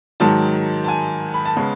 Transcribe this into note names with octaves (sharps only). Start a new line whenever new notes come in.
G#2 D#3 F#3 A5
A5
G#5
B5
A5
C#3 G#3 B3